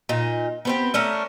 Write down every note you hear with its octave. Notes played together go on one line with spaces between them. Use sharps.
A#2 D#4
B3 C4 G4
A3 C#4 D4 A#4